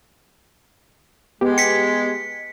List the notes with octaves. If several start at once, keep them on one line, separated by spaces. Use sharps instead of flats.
G#3 B3 G4
B6 C#7